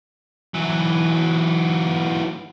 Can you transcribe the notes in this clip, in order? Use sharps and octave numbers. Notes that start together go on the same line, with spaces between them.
E3 F#3